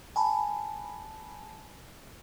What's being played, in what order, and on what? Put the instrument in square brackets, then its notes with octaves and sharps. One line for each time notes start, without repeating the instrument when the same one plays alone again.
[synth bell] G#5 A5 B5